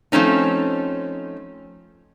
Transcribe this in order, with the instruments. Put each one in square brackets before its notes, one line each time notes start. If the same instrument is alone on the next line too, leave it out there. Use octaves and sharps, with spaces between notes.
[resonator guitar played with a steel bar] F3 A3 C4 C#4 D#4